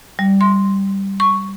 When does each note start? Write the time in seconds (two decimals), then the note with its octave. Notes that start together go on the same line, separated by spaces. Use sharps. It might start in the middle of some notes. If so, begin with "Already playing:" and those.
0.19 G3
0.41 C6
1.20 C#6